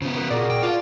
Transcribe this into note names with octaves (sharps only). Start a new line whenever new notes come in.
C#3 F3 B3
A#3 B4
A#2 F#4 G#4 A#4 D5
G5
F4 D5 F5 A5